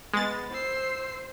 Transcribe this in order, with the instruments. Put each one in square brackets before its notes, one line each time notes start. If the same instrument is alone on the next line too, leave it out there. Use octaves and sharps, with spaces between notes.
[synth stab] G#3 A6 [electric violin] B3
[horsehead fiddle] C5 [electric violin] E6 C7